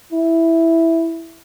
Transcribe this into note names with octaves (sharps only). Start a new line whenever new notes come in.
E4